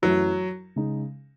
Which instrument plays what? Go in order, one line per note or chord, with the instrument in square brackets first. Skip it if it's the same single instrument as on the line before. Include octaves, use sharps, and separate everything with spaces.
[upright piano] F#2 E3 A3 E4 [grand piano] F#3
[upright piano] C#3 G#3 D#4